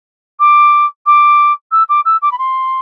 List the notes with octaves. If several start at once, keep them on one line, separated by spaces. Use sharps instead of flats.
D6
D6
E6
D6
E6
D6
B5
C6